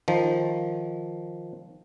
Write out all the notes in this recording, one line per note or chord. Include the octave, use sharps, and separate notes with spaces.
D#3 F3